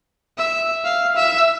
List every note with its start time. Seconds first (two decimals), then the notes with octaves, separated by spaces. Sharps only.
0.38 E5
0.85 F5
1.16 E5